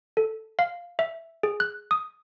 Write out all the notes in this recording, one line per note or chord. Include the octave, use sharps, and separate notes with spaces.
A4
F5
E5
G#4
F#6
D#6